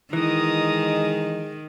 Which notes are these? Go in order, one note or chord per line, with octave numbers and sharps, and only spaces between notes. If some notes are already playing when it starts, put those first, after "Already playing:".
D#3 E3 G#3 A#5 D#6